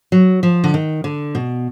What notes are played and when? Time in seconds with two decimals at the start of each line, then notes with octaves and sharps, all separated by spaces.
0.12 F#3
0.43 F3
0.64 D3
0.74 D#3
1.04 D3
1.35 B2